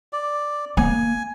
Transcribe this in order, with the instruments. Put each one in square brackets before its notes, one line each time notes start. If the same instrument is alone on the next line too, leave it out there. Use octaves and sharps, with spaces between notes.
[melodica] D5
[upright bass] A#3 [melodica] G#5